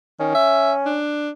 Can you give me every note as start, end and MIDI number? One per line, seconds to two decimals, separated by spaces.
0.20 0.32 51
0.20 0.98 61
0.35 0.72 76
0.86 1.30 62